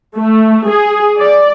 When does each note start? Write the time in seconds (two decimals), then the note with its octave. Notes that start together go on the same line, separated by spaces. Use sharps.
0.18 A3
0.69 G#4
1.20 D5